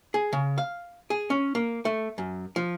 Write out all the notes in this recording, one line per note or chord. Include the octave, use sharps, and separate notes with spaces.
G#4
C#3
F5
G#4
C#4
A#3
A3
F#2
F3